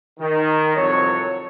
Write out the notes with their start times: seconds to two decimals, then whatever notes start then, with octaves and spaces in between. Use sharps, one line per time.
0.19 D#3
0.75 C2 F2 F#3 A4 C#5